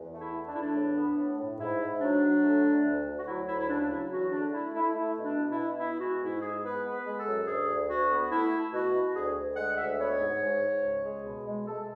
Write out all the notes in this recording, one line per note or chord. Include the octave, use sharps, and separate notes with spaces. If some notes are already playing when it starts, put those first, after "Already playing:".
Already playing: E2
A3
E4
A3
D4
E2 E4
D4
A2
B3
A2
A2
G#2 E4
G#2
F#3 D4
F#3
A3
D3
D2
D2
F#4
F#3 E4
D2 E4
E4
C#3 D4
F#3 E4
E2 F#4
D3 D4
A3 E4
A3 E4
A3 E4
B2
D4
B2
E4
B2
B3 E4
G#3 F#4
G#2 E4
G#3 G#4
B3 B4
B3
B4
G#3
A4
F#2
D2 G#4
D2
D2 F#4
B3
A3 E4
A3
B2 F#4
B2
D2 G#4
D2
G#3 F#5
D2 E5
B3 C#5
G#2
G#2
G#2
C#2
G#3
B2
G#3
G#3 A4